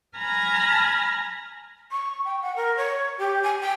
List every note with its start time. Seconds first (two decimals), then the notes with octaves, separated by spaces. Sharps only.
0.17 G#5 A#5 B5 F6 G#6 A#6
1.92 C#6
2.25 G5
2.42 F#5
2.56 A#4
2.77 C#5
3.18 G4
3.43 G#5
3.61 G5